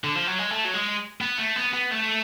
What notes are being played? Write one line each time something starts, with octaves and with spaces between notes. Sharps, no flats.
D3
F3
F#3
G#3
A3
F#3
G#3
B3
A3
B3
B3
A3